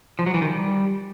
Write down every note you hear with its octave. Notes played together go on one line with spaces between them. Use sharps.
F3
F#3
E3
D#3
G3